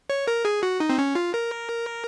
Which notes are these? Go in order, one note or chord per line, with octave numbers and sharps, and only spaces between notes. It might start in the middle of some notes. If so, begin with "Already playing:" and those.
C#5
A#4
G#4
F#4
D#4
C4
C#4
F4
A#4